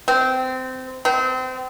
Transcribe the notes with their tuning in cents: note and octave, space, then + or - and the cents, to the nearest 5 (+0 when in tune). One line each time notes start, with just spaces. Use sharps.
C4 -20
C4 -30